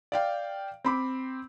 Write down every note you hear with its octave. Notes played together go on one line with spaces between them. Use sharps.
D5 F5 G5
C4 B5 D6